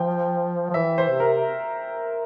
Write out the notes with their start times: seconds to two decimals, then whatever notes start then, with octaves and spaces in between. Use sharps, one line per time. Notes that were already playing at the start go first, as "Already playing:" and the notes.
Already playing: F3 G5
0.70 F3
0.74 E3 E5
0.98 C5
1.09 C3
1.20 A#4